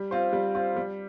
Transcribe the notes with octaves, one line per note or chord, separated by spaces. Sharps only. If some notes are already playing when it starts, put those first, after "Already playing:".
Already playing: G3
C4 F4 C5
G3
C4 F4 C5
G3